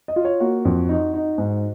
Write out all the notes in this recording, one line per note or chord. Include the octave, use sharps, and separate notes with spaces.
D#5
F4
C#5
A#3 F#4
F2
D#4
D#4
G#2